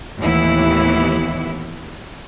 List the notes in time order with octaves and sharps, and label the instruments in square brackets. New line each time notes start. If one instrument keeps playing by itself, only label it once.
[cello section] D#2 A2 E3 B3 E4